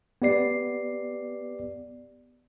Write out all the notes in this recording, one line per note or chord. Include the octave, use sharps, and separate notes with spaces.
B3 G4 D5 C7